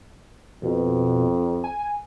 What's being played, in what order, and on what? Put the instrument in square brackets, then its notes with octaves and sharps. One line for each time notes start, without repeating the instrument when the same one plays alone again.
[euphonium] F2 [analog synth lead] B2
[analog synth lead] G#5